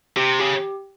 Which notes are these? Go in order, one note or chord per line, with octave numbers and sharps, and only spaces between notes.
C3 G4
C#3 G4